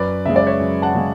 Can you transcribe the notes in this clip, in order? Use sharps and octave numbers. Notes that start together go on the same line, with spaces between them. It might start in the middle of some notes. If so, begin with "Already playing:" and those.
Already playing: F#2 B4 D5
C#3 G#3 E5
D5
C#5 E5
F#2
F#5 A5
C#3 G#3